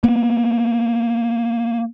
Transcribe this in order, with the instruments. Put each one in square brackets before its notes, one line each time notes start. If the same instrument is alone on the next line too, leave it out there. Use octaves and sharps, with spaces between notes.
[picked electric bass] A#3 B3